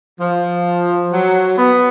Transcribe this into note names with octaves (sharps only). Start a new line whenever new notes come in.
F3
F#3
B3